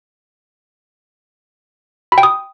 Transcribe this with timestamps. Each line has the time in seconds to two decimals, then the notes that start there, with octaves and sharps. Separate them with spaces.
2.12 B5
2.18 G5
2.23 D#6